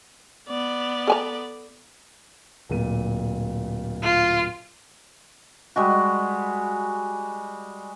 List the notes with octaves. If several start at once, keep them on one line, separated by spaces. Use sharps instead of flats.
B3 D5
A4 G#5 A#5
D1 A#2 D#7
F4
G3 G#3 F#4